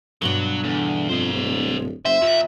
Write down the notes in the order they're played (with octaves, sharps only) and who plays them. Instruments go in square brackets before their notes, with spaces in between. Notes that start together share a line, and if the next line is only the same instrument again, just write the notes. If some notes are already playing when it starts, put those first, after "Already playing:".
[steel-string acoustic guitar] G2 B2 D4 [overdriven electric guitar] F#3
[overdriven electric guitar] E2 [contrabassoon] D3
[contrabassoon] F2 [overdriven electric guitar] C5 D#5
[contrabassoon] D1
[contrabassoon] F#1 [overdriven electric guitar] C5 [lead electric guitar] E5
[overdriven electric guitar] D#2 [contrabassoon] A#2